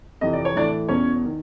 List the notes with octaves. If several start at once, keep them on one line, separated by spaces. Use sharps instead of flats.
F2 C3 E3 D#5
D5
C#5
A2 E3 D4 D5
E2 B2 C#4 C#5
D#3